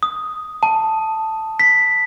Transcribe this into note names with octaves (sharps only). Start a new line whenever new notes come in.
D#6
A5
B6